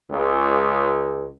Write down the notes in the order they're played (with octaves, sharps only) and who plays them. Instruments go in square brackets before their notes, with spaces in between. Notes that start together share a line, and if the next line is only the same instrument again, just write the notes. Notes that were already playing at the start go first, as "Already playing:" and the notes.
[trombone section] C#2